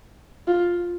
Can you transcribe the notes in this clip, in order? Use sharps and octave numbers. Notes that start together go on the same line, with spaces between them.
F4